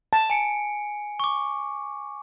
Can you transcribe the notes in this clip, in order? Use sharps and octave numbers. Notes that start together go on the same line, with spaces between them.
A5
G#5 C#7 D7
C#6 D6